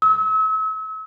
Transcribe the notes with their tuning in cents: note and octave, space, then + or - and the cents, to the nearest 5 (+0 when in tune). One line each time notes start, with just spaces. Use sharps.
E6 -40